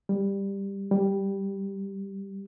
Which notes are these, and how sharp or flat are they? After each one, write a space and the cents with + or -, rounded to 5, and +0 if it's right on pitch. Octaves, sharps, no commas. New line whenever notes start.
G3 +10
G3 +0